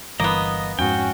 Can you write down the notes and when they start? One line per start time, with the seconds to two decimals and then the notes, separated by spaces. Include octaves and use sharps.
0.20 G1 G2 E3 A#3 B3 D#5
0.79 F2 G#2 C#4 F#4 G5